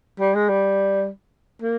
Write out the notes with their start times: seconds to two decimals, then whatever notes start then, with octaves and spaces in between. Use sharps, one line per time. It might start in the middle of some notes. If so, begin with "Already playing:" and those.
0.20 G3
0.35 G#3
0.49 G3
1.62 A#3